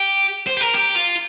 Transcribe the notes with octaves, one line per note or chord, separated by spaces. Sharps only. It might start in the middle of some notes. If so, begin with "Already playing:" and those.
Already playing: G4
C5
G4
A#4
G4
F4